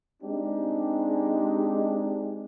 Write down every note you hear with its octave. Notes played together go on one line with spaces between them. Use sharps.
G#3 C4 D4 D#4 G4